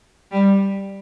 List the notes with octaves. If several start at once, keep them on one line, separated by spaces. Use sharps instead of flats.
G3